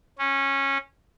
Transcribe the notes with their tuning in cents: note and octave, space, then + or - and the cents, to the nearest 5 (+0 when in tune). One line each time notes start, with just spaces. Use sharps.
C#4 -15